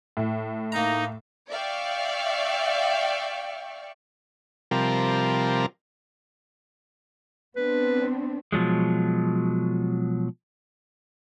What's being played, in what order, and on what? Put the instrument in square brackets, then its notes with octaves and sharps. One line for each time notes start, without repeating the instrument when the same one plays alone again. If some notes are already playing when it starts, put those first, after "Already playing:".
[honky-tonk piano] A2
[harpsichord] A#3 A#5 [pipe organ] D#4
[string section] D5 E5 F5 G5 C#6
[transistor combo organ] C3 F3 G3 A#4
[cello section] B3 C4 D4 [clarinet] B4
[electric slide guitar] B2 F3 F#3 G#3